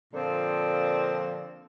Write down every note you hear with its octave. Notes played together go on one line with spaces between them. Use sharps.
A#2 D3 F3 A#3 C4